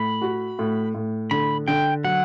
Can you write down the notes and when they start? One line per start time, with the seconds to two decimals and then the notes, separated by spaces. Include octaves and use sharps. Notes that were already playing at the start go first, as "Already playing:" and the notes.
Already playing: A2 B5
0.22 F#4
0.59 A2
0.94 A2
1.31 D3 B5
1.68 D3 G5
2.04 F#3 F#5